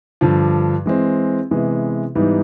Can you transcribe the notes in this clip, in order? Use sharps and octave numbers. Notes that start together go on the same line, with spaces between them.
G2 D3 F3
E3 G#3 C4
C3 E3 G#3 B3
G#2 E3 G3 B3 D#4